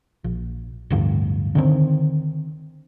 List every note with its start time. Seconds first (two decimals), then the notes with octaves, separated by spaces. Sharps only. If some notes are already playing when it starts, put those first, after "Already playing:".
0.24 A#1
0.90 D1 D2 G2
1.55 D3 D#3 C4